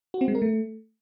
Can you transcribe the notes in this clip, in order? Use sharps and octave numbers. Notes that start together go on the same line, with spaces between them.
F#4
C4
G#3
A#4
A3